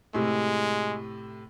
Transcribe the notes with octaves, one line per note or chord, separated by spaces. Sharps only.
A2 C3 G#3